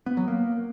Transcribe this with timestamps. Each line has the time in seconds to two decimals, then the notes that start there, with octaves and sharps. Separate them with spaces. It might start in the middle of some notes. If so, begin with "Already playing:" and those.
0.06 B3
0.17 F#3
0.28 A#3